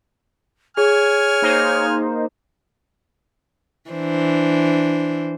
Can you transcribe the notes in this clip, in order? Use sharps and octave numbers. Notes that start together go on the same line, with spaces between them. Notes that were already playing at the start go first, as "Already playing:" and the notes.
G#4 C#5 G#5 F6
A#3 D#4 C5
E3 D4 C5